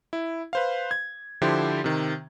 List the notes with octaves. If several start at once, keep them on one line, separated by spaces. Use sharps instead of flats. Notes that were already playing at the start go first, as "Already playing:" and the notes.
E4
B4 C5 F5
G#6
D3 F3 E4 G4 C5
C3 D#3